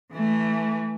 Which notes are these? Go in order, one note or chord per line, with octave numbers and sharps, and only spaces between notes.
E3 A3